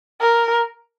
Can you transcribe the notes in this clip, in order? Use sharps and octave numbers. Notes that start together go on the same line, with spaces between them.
A#4